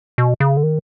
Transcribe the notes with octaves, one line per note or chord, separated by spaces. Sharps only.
B2
C#3
D3
D#3